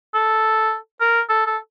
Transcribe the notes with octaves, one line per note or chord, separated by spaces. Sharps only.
A4
A#4
A4
A4